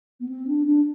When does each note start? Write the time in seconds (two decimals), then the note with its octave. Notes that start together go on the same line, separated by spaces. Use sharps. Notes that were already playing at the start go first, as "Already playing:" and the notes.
0.20 B3
0.29 C4
0.47 D4
0.66 D4